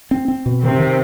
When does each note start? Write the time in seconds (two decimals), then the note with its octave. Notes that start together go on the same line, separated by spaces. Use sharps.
0.11 C4
0.28 C4
0.46 B2
0.63 C3 D#3 C4
0.80 D#3